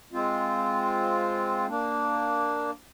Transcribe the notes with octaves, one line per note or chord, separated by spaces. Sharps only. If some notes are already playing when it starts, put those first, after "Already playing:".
G#3 C4 F4
A#3 D4